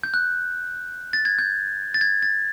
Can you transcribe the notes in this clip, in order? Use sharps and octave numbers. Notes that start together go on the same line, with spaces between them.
G6
F#6
A6
G#6
G6
A6
G#6
A6